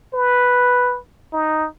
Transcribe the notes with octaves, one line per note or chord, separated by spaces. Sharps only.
B4
D#4